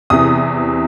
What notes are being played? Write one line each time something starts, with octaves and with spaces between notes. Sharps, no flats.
E2 C3 E3 D#6